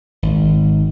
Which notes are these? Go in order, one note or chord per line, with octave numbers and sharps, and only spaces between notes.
G#1